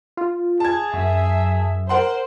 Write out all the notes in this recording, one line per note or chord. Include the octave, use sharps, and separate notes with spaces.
F4
G#4 A5 G#6
F#2 E5
A#4 C5 F#5 C6